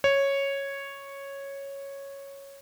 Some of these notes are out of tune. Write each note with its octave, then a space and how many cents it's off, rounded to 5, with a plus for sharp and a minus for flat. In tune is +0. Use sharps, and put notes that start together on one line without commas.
C#5 -5